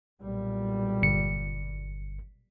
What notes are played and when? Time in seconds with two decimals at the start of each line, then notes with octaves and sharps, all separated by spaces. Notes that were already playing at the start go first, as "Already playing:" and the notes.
0.21 B1 A#2 G3
1.03 G1 C#7